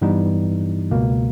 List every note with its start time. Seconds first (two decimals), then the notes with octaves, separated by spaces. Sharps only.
0.02 G2 E3 G3 B3 D#4
0.91 C#2 B2 A#3